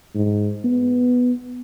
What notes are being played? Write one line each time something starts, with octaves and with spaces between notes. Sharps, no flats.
G#2
B3